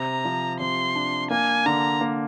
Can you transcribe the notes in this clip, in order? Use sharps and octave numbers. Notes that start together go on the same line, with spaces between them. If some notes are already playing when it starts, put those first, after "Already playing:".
Already playing: C3 A#5
F3
C3 C6
D4
A#3 G#5
D3 A#5
A#3